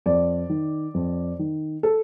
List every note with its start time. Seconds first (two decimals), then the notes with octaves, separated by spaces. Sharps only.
0.06 F2 D5
0.49 D#3
0.94 F2
1.39 D#3
1.83 A4